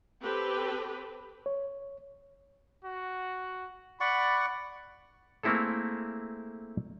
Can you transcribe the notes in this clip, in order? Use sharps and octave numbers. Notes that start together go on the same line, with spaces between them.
C4 G4 A4 B4
C#5
F#4
D5 F#5 B5 C#6
A3 A#3 C4 E4 G#4 A4